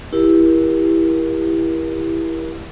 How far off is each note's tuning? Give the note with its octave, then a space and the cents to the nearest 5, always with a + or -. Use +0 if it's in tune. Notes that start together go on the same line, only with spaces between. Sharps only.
E4 +0 G4 +10 A#4 +30